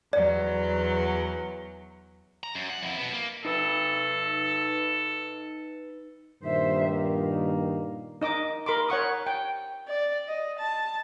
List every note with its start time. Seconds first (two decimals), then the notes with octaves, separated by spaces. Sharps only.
0.13 E2 F#3 D5
2.43 A#5
2.55 F#2
2.70 F#5
2.83 F2 E4
2.98 B2 B3
3.13 A#3
3.45 D#4 A4 B4
6.43 G2 A#2 D#3 C5 E5
6.86 A#3
8.21 D#4 D#5 D6
8.66 A#4 B5 C6 D6
8.89 C#5 F#5 C#6 D#6
9.27 G5
9.88 D5
10.28 D#5
10.59 A5